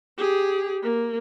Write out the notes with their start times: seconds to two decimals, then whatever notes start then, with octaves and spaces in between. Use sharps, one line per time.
0.18 G4 G#4
0.83 A#3